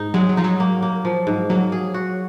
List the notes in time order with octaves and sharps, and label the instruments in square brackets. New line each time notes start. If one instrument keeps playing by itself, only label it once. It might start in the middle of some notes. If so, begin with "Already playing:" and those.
Already playing: [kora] G#2 D#4
[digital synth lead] F#3 [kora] G#3
[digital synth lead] F#3
[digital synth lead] F3 [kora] D#4
[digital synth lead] F#3
[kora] A#3
A#3
F3
G#2
[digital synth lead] F#3 [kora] A#3
[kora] G#4
F#4